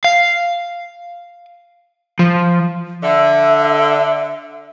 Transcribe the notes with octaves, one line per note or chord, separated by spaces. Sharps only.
F5
F3
D3 E5